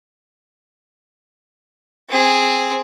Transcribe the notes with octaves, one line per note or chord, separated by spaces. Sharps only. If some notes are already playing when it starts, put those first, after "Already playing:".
C4 G#4